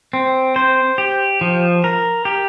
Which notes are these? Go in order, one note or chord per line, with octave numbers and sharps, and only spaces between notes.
C4
C5
G4
F3
A#4
G4